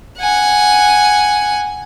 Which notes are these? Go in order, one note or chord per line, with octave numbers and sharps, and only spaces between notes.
F#5 G#5